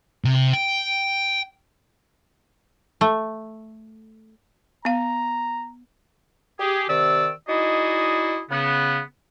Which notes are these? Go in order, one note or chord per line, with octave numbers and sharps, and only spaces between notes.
C3
G5
A3
B3 F5 A#5
G4 G#4
C3 D#3 D5 E6
D#4 E4 F#4 G#4 D5 D#5
C#3 B3